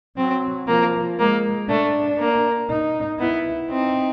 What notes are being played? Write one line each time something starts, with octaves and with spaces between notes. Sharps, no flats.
F#3 C4
F3 A#3
G#3 A#3
A3 D4
A#3
D#4
B3 E4
C4 D#4